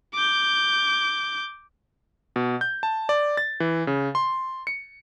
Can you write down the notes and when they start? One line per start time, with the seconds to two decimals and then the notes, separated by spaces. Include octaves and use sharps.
0.14 D6 G6
2.36 B2
2.61 G6
2.83 A5
3.09 D5
3.37 A6
3.60 E3
3.87 C#3
4.15 C6
4.67 C#7